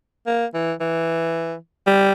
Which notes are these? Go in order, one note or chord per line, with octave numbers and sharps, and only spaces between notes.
A#3
E3
E3
G3